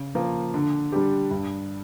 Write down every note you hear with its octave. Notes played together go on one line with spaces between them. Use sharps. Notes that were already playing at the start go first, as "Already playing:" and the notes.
Already playing: C#3
F3 A#3
D3
G3 D4 G4
G2